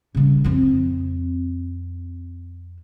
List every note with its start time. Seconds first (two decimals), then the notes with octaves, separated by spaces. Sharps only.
0.15 C#3 G3
0.44 F2 C4